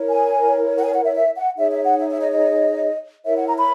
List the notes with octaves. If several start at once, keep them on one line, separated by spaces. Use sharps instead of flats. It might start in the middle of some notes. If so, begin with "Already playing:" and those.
Already playing: E4 A#4 C#5
G#5
F#5
G#5
F#5
E5
E5
F#5
D#4 G#4 C#5 E5
E5
F#5
E5
E5
D#5
D#5
E4 A#4 C#5 E5
F#5
A#5
B5